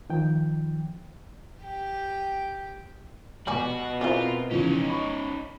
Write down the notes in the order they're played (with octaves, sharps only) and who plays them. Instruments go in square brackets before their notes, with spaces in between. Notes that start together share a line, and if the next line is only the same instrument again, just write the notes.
[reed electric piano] D#3 F3 G5
[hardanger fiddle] G4 G5
[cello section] B2 [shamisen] G3 D5 G#5 [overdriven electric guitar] F#4
[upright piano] C4 A#4 C5 [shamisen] E4 G#4 D5 [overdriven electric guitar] F4
[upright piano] C#3 E3 F3 [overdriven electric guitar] C#4 D#4
[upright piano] D#5 B5 C#6